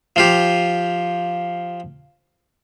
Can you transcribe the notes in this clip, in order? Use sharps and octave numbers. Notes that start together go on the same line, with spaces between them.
F3 F4 G4